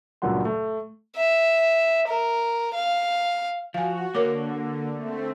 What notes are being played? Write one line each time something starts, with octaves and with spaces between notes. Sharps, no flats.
C#2 G2 A#2 F#3 F#5 C6
A3
E5
A#4
F5
F3 F#4 F5 G#5
D3 A#3 A#4 C#5 D6
A3 C4